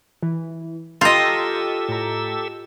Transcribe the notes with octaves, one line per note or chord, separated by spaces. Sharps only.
E3
F4 G4 A4 D#5 G5 A#5 C6 E6
A2 A#5